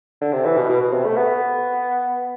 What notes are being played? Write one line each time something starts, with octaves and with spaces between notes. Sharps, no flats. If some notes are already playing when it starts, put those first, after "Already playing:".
D3
C3
E3
B2
B2
B2
C3
A3
B3